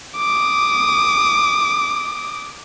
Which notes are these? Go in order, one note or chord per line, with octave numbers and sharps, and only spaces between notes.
D6 D#6